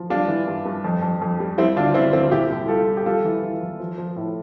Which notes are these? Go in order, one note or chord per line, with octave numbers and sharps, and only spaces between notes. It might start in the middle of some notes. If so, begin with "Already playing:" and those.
Already playing: F3
G3 D4 F4
E3
G2
G2
F2
F2
F2
G3
G3 C4 E4
D2 D4 F4
D2 C4 E4
D2 C4 E4
A#2 E4 G4
C2
G3 F4 A4
G3
G4
G3 F4 A4
E3
E3
E2
F3
F3
A2